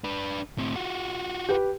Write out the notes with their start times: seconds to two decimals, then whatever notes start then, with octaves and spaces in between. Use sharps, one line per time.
0.04 D4 B4
0.58 A2 C4
0.76 F4 F#4
1.49 G4 B4